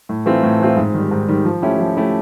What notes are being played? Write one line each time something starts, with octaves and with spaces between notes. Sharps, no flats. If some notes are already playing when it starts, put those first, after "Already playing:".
A2
E3 A3 C4 F4
A2
E3 A3 C4 F4
G#2
D#3 G3
G#2
D#3 G3
F3
A3 C#4 E4 G4
F3
A3 C#4 E4 G4